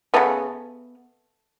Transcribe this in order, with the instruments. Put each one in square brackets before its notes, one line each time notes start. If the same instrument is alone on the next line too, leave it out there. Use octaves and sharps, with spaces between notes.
[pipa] C#3 A3 B3